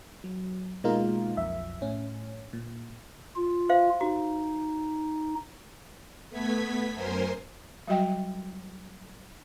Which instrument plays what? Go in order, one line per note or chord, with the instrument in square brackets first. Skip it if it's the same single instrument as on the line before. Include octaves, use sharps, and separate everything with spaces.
[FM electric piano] F#3
B2 G#3 A#3 D#4 F4 A#4
B1 F2 E5
A2 C#4
A#2
[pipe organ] F4
[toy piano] C5 E5 F5
[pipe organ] D#4 [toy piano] F#4
[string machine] A3 B3 G#6 B6
F#2 A#4 C5 G#5 C6
[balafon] F#3 G3 F#4 D#5 G5